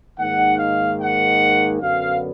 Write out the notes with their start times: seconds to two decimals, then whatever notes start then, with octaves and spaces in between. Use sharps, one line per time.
0.19 G#2 D#3 A#3 F#5
0.59 F5
1.00 F#5
1.81 F#2 D3 F#3 B3 F5